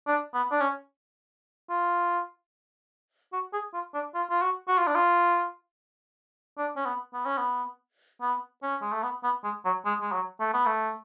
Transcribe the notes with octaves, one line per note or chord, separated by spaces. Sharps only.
D4
B3
D4
C#4
F4
F#4
G#4
F4
D4
F4
F4
F#4
F#4
F4
D4
F4
D4
C#4
B3
B3
C#4
B3
B3
C#4
G#3
A3
B3
B3
G#3
F#3
G#3
G#3
F#3
A3
B3
A3